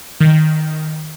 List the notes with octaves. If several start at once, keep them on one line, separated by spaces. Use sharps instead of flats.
D#3